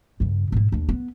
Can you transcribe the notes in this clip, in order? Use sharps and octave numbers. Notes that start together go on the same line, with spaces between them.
G2 C#3
G#2 E4
D#2 D4
B3